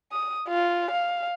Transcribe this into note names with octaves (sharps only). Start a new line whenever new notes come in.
D#6
F4
F5